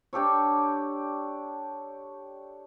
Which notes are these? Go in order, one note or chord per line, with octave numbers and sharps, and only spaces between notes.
D4 G4 A4 C#5